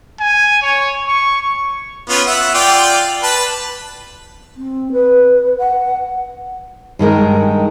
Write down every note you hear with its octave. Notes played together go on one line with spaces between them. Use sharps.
G#5
C#5
C#6
B3 C#4 F4
E5 F#5
F4 D5 G5
B4 A5 B5
C4
B4
F#5
G2 D#3 G#3 A#4